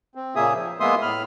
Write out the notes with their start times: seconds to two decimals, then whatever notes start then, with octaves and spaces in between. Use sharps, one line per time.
0.15 C4
0.36 A#2 C#3 A#3 G#4 E5 D#6
0.54 F3
0.80 G#3 A#3 B3 E5 C6 D#6
1.02 A2 B5 F6